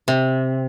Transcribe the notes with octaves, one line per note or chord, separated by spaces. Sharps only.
C3